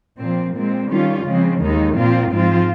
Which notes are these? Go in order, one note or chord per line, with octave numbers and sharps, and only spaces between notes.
A#2 F3 C4
A#2 G#3 C4
D#3 G3 C#4 F4
C#3 F3 G#3 C4
D#2 D#3 G#3 D#4
A#2 F3 C4 F4
G#2 F3 C4 F4